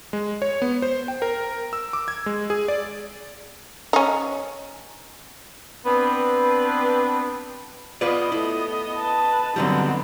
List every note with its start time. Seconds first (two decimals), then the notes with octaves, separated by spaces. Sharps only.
0.13 G#3
0.42 C#5
0.62 B3
0.82 C5
1.08 G5
1.22 A#4
1.73 E6
1.93 D6
2.08 G#6
2.26 G#3
2.50 G#4
2.68 D5
3.93 C#4 D#4
5.85 B3 C4 D4 B4
8.01 B3 F4 B4 D5 D#5
8.32 A3 E4
8.98 B4 A5
9.56 D3 F#3 G3 B3 C4 D#4